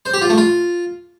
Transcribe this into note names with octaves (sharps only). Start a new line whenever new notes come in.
C5
G4
F4
A3
F4